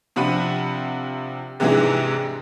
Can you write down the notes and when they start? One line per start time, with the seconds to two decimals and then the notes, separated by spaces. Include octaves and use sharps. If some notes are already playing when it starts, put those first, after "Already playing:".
0.16 C3 F3 D4 F#5 B5 D#7
1.60 G#2 C3 E3 G#3 D4 G#4